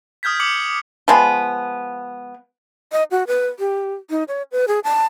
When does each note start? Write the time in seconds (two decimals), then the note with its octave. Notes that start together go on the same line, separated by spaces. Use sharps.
0.23 D#6 F6 G6 G#6 B6
0.40 D6 C#7 F#7
1.08 F3 G#3 B3
2.92 D#5
3.11 F#4
3.27 B4
3.59 G4
4.10 D#4
4.28 C#5
4.52 B4
4.68 G#4
4.84 A5